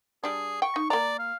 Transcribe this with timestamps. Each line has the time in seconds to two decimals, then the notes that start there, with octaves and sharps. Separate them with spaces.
0.24 G3 D4 G#4
0.62 G5 C#6
0.76 D#4
0.90 A#3 D5 A#5
1.19 F5